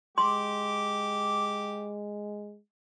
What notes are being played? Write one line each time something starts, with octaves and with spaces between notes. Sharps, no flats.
G#3 G4 C6 D6